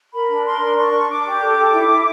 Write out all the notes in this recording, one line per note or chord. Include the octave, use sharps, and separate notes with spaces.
A#4 B5
D4
A#4 C6
D4
D4 C#6
D4
D4 D6
G4
A4
A4
E4
E4